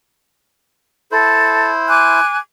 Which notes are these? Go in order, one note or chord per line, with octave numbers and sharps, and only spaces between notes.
E4 A4 C5 A5
G#5 D6 F#6